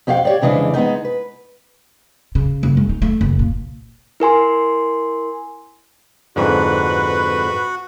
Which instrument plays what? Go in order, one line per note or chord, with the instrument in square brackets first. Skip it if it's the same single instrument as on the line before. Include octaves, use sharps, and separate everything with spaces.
[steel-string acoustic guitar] F2 C#4 F#4 G4 F5 G5
G4 C#5 D5
F2 C#3 E3 G#3 D4
G#3 B3 D#4
B4
[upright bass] C#3
F#1
G#3
D#4
A3
F#1
A#2
[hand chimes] E4 A#4 G#5 C6
[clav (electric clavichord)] F2 G#2 D3 [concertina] F#4 [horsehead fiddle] B4